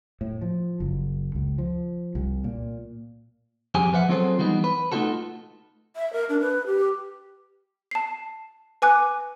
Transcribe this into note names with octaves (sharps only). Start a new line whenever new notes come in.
A2
F3
F#1
C#2
F3
C2
A#2
F2 G4 G#4 G#5
F3 B4 E5 F#5
F#3 C4 F4 G#4 A4 C5
E3 G3 B3 D#4
B4
A3 A#3 D#4 F4 F#4 A4
E5
A#4
D4
B4
G4
A5 C7
B4 G#5 D6 F#6